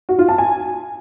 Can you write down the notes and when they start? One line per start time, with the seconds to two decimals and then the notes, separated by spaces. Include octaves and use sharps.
0.09 F#4
0.19 F4
0.29 A5
0.38 G#5